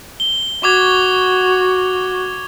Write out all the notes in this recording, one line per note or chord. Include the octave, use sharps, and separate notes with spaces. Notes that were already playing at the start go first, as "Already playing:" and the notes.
G7
F#4 C#6 D6 G#6